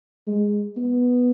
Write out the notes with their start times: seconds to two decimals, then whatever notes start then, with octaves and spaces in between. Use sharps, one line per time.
0.27 G#3
0.77 B3